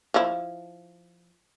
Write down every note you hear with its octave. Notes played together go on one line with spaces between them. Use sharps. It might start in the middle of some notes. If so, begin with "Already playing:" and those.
F3 E4